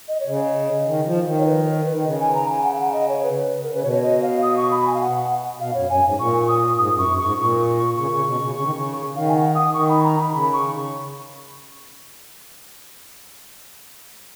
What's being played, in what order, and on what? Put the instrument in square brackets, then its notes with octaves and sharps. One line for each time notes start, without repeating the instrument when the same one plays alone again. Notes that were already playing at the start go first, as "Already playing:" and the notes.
[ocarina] D#5
C#5
[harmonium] C#3
[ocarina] D#5
[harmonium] D#3
F3
D#3
[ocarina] C#5
B4
A#4
B4
[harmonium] D#3
[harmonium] C#3 [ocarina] D#5
[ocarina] G#5
A#5
G#5
F#5
F5
F#5
D#5
C#5
B4
A#4
[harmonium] C#3 [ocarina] B4
[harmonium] B2 [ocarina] C#5
[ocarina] C#5
D#5
F5
D#6
C#6
B5
G#5
F5
F#5
[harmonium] B2 [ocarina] F5
[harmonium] F#2 [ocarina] C#5
[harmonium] F#2 [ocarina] G#5
[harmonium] G#2
[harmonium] A#2 [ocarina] C#6
[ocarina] D#6
[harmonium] G#2 [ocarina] D#6
[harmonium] F#2 [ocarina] C#6
[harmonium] F#2
[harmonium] G#2 [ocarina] C#6
[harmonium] A#2 [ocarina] C#6
[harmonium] C#3 [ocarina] C#6
[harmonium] C#3
B2
C#3
C#3
D#3
C#3
[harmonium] D#3 [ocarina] F5
[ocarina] G#5
F#5
D#6
[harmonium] D#3 [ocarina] C#6
[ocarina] B5
A#5
B5
[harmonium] C#3 [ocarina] B5
[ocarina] C#6